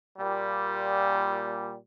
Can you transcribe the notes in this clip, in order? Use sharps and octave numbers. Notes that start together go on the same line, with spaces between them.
A#2 G3